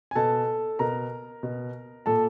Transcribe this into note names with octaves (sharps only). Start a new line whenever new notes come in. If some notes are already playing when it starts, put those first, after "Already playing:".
G#5
B2 A4 A5
B2 A#4 A#5
B2
A#2 A4 A5